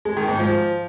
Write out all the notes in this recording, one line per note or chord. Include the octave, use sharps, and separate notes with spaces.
G#3
D#3
G#2
F3